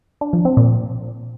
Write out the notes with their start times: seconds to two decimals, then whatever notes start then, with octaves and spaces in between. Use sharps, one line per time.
0.21 D4
0.33 F3
0.45 C4
0.57 A#2